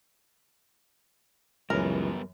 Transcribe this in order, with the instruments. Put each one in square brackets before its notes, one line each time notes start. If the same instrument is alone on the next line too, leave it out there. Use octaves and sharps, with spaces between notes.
[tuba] C#2 [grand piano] F#2 E3 F#3 [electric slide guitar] G3 B3 [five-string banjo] A#4